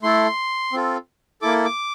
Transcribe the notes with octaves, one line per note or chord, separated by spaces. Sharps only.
A3 E4 A4 C6
C4 F4 A4
A#3 E4 A4 D6
D6